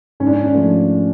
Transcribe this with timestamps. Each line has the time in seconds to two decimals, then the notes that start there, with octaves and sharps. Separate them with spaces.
0.20 G#2 C#4
0.27 D4
0.34 C#4
0.54 F3 A3